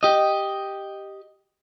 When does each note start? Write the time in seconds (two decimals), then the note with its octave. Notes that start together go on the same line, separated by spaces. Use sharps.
0.03 G4 D#5